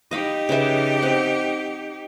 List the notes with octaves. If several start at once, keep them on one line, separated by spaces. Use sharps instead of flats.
D#4 G4 D#5 F5 B5
C#3 B4 E5
C4 F#5